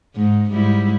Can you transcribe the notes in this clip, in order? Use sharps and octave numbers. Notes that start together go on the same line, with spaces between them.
G#2
G#2 G3 E4